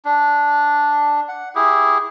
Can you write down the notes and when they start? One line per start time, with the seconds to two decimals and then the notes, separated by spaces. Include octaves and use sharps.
0.05 D4
1.29 F#5
1.55 E4 G4 G#4